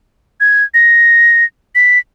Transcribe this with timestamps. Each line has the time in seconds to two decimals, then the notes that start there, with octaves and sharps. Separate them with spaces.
0.40 G#6
0.74 A#6
1.75 B6